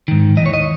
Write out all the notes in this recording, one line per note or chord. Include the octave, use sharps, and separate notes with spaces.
G#2 D#3
D#2 C#3 E3 C#5 D#5
D#5